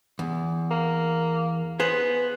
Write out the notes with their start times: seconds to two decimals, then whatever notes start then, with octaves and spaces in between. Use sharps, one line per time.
0.19 E2
0.71 A#3
1.80 B3 G#4 C5